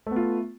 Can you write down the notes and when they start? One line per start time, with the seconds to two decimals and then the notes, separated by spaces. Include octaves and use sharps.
0.07 A3
0.11 B3
0.16 F4